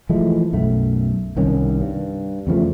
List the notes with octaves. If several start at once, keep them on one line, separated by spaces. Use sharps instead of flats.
E3 F3 G#3 A3
B1 F#2 A3
C2 D#3 C#4
G2
E2 C#3 F3 A3